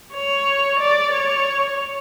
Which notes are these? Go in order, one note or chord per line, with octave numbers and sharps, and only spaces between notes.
C#5
D5
C#5